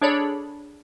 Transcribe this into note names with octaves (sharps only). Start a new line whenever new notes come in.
D4 G#4 A4 C#5 D5 B5